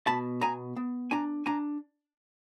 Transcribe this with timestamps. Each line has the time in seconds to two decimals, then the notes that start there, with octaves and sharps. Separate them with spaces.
0.07 B2 A5 B5
0.41 B3 G#5 A#5
0.76 B3
1.11 D4 G#5 A#5
1.46 D4 G#5 A#5